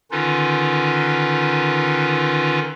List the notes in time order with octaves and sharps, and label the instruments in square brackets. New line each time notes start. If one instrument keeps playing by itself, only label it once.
[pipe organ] D3 D#3 C#4 D#4 F4 B4